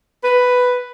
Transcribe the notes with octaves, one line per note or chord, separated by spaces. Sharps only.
B4